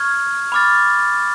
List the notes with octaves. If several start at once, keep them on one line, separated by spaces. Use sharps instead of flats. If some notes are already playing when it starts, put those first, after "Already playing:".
Already playing: C#6 F6 G#6
B5 D6 F6 A6